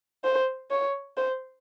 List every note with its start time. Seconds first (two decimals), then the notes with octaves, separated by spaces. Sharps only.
0.24 C5
0.71 C#5
1.17 C5